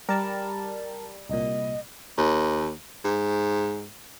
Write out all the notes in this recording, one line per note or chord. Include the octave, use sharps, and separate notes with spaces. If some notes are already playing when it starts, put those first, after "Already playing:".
G3 A#4 A5
C2 A#2 D#5
D#2
G#2